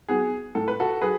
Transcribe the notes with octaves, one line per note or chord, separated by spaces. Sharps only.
F#3 B3 G#4
A2 A4
B4
F#4 A4
F#3 G#4 B4